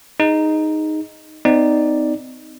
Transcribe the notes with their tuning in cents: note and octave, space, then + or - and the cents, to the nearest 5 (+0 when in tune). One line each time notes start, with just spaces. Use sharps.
D#4 +0 G#4 +0
C4 -45 D#4 +0 D5 +0